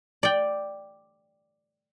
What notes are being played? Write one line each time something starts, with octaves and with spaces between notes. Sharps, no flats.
D5 G5